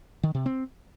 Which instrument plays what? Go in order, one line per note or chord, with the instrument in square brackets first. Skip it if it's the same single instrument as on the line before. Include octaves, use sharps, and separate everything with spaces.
[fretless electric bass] D#3
C3
C4